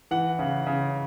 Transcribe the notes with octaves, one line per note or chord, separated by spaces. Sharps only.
E3 F#5
C#3
C#3